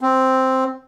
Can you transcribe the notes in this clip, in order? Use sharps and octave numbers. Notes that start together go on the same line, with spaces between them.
C4